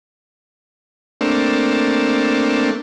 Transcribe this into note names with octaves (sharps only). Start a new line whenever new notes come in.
A3 A#3 C4 D4